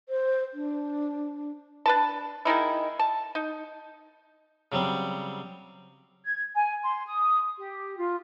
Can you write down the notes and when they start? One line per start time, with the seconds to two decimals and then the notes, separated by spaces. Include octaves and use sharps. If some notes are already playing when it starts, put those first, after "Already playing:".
0.09 C5
0.54 D4
1.86 D4 B4 A5
2.45 D#3 G#3 D#4 E4
2.99 A5
3.35 D#4
4.72 C#3 F#3 G3 C4
6.25 G#6
6.54 G#5
6.83 C6
7.05 D#6
7.57 G4
7.98 F4